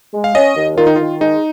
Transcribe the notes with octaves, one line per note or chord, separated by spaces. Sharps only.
G#3
F5
C#4 D#5
D#2
D#3 F4
D#4
D#3 F4
G#3 D#4